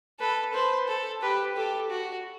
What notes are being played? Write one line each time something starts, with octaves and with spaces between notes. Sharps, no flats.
A4 B4
B4 C5
A4
G4 B4
G4 A4
F#4